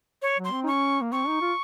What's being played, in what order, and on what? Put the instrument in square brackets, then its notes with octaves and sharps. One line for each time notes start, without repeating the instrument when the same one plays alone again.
[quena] C#5
[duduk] F#3
[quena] C6
[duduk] C4
D#4
[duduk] C#4 [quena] C#6
[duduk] A#3
[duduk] C4 [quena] C#6
[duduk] D#4
F4